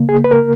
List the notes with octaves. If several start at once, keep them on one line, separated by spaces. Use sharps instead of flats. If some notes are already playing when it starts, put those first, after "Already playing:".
Already playing: C#3 A#3
G#4
B4
A#4